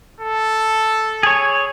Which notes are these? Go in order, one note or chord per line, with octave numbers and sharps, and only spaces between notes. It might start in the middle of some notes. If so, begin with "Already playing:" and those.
A4
G#4 C#5